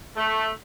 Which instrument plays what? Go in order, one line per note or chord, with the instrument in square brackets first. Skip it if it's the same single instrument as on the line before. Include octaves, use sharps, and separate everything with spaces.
[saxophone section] A3